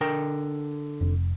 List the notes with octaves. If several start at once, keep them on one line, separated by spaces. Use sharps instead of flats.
D3 A#4 G5
F1